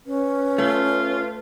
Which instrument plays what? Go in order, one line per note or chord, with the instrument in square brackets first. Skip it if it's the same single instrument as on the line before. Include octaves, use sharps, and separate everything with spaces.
[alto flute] C#4 [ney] B4
[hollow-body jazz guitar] A3 [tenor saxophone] F4